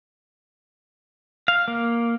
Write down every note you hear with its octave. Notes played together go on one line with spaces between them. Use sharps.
F5
A#3